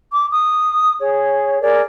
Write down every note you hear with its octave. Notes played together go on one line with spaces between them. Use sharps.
D6
D#6
G#4 C#5
G#4 A#4 D5